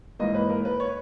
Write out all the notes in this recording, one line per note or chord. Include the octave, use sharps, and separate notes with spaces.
G#2 E3 A#3 D#5
B4
A#4
B4
C#5